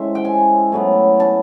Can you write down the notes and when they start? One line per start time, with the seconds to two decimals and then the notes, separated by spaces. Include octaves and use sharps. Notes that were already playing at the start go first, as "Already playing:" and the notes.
Already playing: A2 G#3 C#4 C5 E5
0.15 G5
0.25 G#5
0.72 A2 F#3 B3
1.20 A5